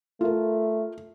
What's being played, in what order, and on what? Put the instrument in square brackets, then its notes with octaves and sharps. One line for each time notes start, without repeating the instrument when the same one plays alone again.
[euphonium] A3 [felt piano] F4 A#4